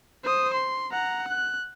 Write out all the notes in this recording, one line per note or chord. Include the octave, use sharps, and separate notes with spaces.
C5 D#6
C6
F#5 A#5
F#6